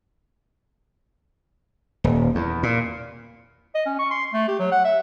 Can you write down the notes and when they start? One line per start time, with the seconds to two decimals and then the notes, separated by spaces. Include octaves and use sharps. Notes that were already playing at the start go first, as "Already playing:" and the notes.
2.04 D#1
2.35 E2
2.63 A#2
3.75 D#5
3.86 C#4
3.99 C#6
4.11 C6
4.33 A3
4.48 G4
4.60 F#3
4.72 F#5
4.85 E5